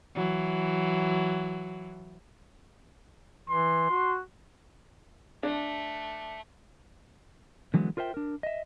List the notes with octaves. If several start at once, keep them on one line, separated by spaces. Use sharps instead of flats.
E3 F#3
E3 C6
F#4
A3 D4
D3 E3 F#3 G#3 B3
F4 A#4 C5 E5 G5
D4 A#4
D#5 E5